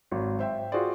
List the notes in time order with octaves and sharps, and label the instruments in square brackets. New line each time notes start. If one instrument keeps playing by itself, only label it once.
[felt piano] G#1 F#3
C5 E5 G5
F4 F#4 G#4 C5 D5